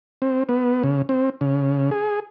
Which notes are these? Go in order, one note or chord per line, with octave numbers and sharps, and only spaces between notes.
C4
B3
C#3
C4
C#3
G#4